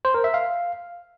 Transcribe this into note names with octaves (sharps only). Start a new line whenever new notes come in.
C5
A#4
E5
F5